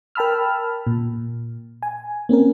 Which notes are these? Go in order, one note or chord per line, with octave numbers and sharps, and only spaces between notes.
A#4 G5 A5 B5 E6 F6
A#2
G#5
A#3 C4 C#4 A#4